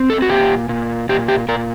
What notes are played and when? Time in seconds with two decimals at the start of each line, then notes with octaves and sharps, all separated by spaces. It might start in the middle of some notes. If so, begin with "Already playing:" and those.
Already playing: C4
0.10 A4
0.22 F#4
0.29 A#2 G4
0.69 A#2
1.09 A#2 G4
1.28 G4
1.48 A#2 A#4